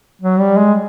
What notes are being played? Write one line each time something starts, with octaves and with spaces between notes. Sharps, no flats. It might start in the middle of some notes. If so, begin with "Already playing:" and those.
F#3
G3
G#3